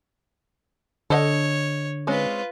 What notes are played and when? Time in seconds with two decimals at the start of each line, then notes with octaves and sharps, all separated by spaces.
1.10 D3 A4 C#5 D#5 F#5
2.07 G#3 C4 C#4 F4 B4